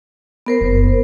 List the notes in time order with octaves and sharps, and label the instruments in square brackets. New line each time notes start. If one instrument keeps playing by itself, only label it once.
[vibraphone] B3 A#4 C5
[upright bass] F#1